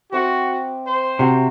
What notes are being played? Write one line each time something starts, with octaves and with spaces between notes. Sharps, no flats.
C4 F#4 E5 D6
C5
C3 F#4 E5 G5